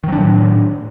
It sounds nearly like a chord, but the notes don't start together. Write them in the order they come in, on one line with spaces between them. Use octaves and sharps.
D#3 F#3 D4 A2